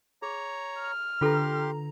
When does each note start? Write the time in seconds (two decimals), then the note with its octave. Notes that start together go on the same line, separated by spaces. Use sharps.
0.22 G#4 C#5 A#5
0.80 F6
1.21 D3 F4 G4 A4 B4 A#5 C6